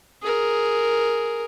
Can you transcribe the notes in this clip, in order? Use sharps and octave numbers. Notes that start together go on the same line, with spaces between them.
G#4 A#4